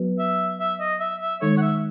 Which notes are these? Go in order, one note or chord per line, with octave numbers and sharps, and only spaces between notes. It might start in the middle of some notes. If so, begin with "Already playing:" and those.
Already playing: F#3 B3 F#4 B4
E5
E5
D#5
E5
E5
D#3 G#3 D#4 A4 C#5
F#5
E5